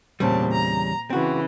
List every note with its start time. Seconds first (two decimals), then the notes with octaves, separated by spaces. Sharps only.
0.20 E2 A#2 C#3 G3 C4 A5
0.52 A#5
1.10 C#3 E3 C4 F#4